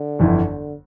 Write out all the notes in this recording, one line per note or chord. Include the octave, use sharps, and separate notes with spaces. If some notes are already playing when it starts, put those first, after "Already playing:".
Already playing: D3
G1 F2 E3